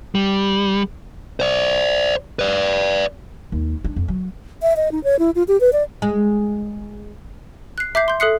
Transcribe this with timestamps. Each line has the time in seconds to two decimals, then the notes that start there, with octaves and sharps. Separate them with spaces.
0.15 G3
1.40 C5 D5
2.39 B4 D5
3.52 D#2
3.84 D4
3.96 F2
4.08 F#3
4.62 E5
4.76 D#5
4.92 D#4
5.04 C#5
5.19 E4
5.35 F4
5.48 G4
5.60 B4
5.73 D5
6.02 G#3
7.78 F#6 C7
7.95 E5 D6 G6 C7
8.08 C6 G6
8.20 A4 E5 D#6 F#6 C7 C#7